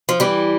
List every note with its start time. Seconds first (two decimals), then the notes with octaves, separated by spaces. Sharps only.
0.09 F3
0.20 E3 G3